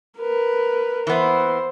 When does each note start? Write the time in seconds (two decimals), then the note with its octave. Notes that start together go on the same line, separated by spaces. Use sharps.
0.18 A#4 B4
1.07 E3 B3 C5